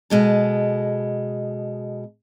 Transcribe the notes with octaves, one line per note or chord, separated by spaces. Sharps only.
B2 G#3 A4